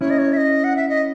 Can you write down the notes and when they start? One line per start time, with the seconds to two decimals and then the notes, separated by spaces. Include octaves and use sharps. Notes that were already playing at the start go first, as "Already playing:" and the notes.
0.01 C#4 E4 C#5
0.10 D#5
0.19 C#5
0.33 E5
0.37 D#5
0.64 F#5
0.76 E5
0.89 D#5